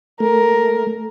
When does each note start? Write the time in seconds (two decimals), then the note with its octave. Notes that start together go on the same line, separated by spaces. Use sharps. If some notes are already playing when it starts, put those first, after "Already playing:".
0.20 A3 A#4